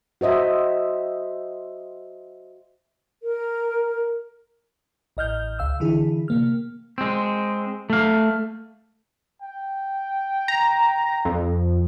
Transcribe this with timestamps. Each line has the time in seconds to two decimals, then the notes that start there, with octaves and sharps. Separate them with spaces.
0.21 F#4 C5 D#5 E5
3.23 A#4
5.17 A1 D#5 F6 G6
5.59 C#2 F5 E6
5.80 D3 E3 E4 G#4
6.28 C3 A#3 F6
6.98 G#3 C4
7.90 A3 F5
9.42 G5
10.48 A#5
11.25 F2